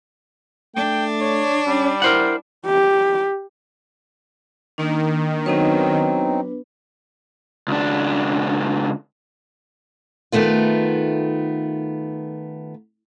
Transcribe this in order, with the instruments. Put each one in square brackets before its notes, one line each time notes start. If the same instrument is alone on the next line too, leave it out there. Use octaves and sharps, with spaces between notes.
[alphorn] A3 [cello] D4 [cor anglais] G5
[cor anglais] C#5
[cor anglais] G3 [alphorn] C#4
[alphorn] E4 [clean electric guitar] A#4 C5 F#5
[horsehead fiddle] G4
[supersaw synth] D#3 [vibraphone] A#3 D4
[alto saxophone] F#3 [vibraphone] B3 D4 B4 [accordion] C4 D#4
[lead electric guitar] C#2 D4
[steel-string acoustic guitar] D#3 A3 B3 F4